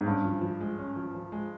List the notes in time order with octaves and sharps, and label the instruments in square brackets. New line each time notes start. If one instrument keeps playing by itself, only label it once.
[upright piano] G#2
[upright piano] G2 [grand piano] C#4
[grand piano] F3
F3
G#3
C#4
F3
F3
G#3